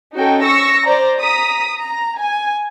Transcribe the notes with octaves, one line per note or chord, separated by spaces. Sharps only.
C#4 D#4 F#4 A4 G5
C#6 E6 A#6 C#7
C5 D5 A#5
A#5 D#6 B6
A#5
G#5